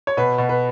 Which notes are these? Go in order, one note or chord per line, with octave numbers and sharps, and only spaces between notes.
C#5
B2 B4
B2
B4